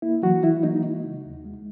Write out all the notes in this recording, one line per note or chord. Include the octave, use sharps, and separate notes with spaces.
A#3 E4
E3 F#3 F#4
E3 E4
A#3 D#4
G#3
C#3
D#2
G#3